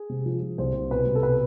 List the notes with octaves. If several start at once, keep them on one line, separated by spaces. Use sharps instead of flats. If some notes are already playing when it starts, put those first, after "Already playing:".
Already playing: G#4
C3
F3
F3
C2 C5
C2
B2 B4
C2
A4
B2 B4